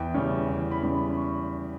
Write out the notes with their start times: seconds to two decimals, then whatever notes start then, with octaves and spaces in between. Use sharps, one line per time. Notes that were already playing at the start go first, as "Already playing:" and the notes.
Already playing: E2 G5
0.14 C#3 G3 C#4
0.49 E2
0.71 B5
0.83 C#3 G3 C#4
0.95 B5
1.13 B5
1.17 C#6